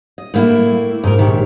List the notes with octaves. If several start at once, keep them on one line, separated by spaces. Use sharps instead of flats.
D#5
A2 A#3 E4
G#2 D#4 A#4
A#1 D#3 G4 C#5